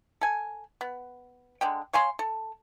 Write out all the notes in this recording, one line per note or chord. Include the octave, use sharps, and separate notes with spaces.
A4 G#5
B3
D3 G#3 G5
C#5 F5 G#5 C6
A4